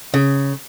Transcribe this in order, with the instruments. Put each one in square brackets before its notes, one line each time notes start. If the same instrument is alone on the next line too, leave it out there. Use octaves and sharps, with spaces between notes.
[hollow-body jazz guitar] C#3